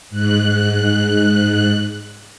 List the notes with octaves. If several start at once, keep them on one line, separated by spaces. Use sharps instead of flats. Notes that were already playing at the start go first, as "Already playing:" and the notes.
G#2 F#6